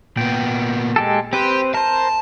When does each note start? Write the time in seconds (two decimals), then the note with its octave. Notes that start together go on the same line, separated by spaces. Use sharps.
0.17 A#2 B3 G5
0.96 G#3 G4 A4
1.33 C4 G4 B4 C5
1.74 A#4 C5 A5